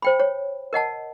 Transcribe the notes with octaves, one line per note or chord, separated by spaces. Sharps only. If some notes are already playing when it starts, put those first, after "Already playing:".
C5 G5 B5
C#5
A#4 D#5 F#5 A5